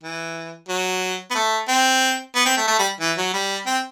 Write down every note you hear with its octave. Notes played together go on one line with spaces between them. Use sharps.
E3
F#3
B3
A3
C4
B3
C4
A3
A3
G3
E3
F#3
G3
C4